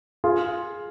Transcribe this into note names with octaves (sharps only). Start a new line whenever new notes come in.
F4 G#4